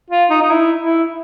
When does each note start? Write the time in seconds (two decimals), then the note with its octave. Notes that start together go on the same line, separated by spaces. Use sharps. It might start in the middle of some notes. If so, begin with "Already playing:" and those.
0.11 F4
0.30 D#4
0.42 D#4
0.51 E4
0.81 E4